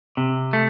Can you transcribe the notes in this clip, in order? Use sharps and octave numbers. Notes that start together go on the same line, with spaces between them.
C3
A3